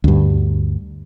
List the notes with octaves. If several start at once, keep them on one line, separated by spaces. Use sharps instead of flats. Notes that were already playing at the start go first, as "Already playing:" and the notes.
D2 G2